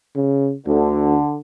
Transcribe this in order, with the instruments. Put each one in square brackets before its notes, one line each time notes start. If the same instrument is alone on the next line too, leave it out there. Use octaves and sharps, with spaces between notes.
[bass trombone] C#3
[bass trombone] D2 [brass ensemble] D3